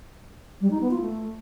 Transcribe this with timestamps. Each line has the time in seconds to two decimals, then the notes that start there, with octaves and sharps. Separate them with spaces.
0.61 G3
0.71 D#4
0.81 B3
0.91 F4
1.01 A3